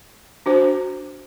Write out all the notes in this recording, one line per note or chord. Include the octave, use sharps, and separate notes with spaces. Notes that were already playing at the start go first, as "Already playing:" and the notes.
D4 F#4 C5